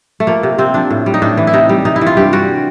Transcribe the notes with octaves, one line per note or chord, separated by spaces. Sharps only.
A3
F3 A#3
C3
C3 C4
F3 D4
A2
G3
D#4
A2 D4
E3
E4
C3 D#4
G3
C3 D#4
E4
E3
F4
G2 G4
G3 F#4